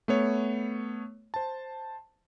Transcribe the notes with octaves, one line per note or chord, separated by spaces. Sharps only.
A3 B3 C#5
C5 A5